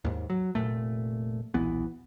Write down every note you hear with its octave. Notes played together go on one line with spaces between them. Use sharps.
D#2 G#2
F#3
F1 C#2 A#2 A3
D#1 B1 E3 B3